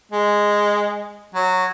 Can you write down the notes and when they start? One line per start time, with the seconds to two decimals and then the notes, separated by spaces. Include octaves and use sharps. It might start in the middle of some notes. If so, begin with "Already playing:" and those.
0.12 G#3
1.35 F#3